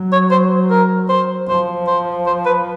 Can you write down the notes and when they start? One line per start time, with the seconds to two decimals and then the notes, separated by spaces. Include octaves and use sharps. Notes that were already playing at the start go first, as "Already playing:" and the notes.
Already playing: F#3
0.12 C#5
0.31 C5
0.70 A#4
1.09 C5
1.49 F3 C5
1.87 C5
2.27 C5
2.46 B4